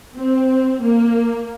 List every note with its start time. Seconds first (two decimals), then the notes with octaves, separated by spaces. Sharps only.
0.17 C4
0.83 A#3